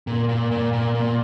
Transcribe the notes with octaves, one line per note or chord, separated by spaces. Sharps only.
A#2
A#2
A#2
A#2
A#2